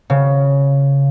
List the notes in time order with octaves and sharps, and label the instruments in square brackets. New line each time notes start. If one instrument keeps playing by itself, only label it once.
[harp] C#3